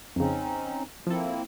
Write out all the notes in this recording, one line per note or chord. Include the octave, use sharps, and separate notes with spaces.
F2 C#3 C4 C#4 D#4
F3 A#3 C4 E4 A4